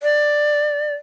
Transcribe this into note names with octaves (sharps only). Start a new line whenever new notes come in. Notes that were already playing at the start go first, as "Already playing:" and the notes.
D5